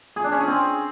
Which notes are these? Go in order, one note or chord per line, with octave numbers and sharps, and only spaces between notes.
G#4
D4
C#4
G#4
C4